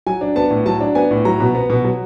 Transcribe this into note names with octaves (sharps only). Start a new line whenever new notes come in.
F#3 G#5
D4
B3 A5
A2
F#3 A5
D4
B3 G#5
A2
F#3 A#5
B2
B3
B2
F#3